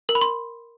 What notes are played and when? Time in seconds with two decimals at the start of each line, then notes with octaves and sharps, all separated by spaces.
0.09 A#4
0.15 B5
0.21 C6